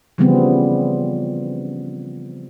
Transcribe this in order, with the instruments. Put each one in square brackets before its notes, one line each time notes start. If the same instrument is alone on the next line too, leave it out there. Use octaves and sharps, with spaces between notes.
[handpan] C#3 E3 F3 G3 B3 C4